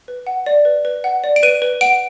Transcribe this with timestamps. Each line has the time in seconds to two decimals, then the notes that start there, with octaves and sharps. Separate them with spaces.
0.08 B4
0.27 F#5
0.46 D5
0.65 B4
0.85 B4
1.04 F#5
1.24 D5
1.36 D7
1.43 B4 D#7
1.62 B4
1.81 F#5 D7